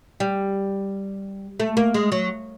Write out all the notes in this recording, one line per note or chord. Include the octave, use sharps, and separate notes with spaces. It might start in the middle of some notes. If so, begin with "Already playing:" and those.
G3
A3
A#3
G#3
F#3